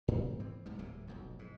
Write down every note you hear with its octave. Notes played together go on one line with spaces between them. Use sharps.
G#2 B3 C4
E3 C4
B1 G#2 C3 G3
D1 C2 C3 A#3
F1 B1 F2
G#2